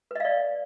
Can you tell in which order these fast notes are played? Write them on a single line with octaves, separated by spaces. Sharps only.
B4 D#5 F5 D5